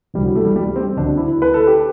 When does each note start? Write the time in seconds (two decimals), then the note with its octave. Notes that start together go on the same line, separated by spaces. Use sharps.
0.14 D2 C3 E3 G3
0.25 F#3
0.36 A3
0.45 G3
0.56 G3
0.76 C4
0.97 D2 D3 F#3 D4
1.17 E4
1.42 B4
1.54 A4
1.67 G4